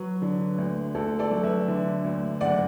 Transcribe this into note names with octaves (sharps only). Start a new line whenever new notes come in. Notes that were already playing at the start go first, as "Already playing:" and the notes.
Already playing: F#3 B4
D3
D2
D2 A4
A4 D5
F#3
B4 E5
D3
D2
F#1 D5 F#5